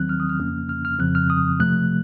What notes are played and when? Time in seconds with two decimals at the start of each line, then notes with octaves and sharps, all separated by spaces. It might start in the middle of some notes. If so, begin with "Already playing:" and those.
Already playing: D#2 D#3 F#3 C4 F#6
0.09 F6
0.20 D#6
0.30 F6
0.39 F2 C#3 F3 A#3 C#4
0.69 F6
0.85 F6
0.99 F2 C#3 F3 C4 F#6
1.15 F6
1.30 D#6
1.60 C3 F3 A3 F#6